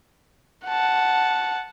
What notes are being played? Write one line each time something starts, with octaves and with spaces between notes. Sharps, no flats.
F#5 A5